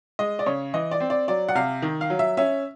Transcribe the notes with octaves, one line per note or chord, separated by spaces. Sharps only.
G#3 D#5
D5
C#3 C#5
E3 D#5
D5
C4
D5
F#3 D5
F#5
C3 F5
D#3
F5
F#3
E5
C#4 E5